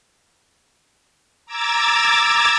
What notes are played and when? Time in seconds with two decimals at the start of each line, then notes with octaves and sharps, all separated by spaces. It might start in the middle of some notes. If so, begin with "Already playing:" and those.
1.46 A#5 D6 E6 G#6 A6